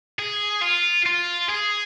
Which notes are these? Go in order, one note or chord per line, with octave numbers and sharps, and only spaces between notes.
G#4
F4
F4
G#4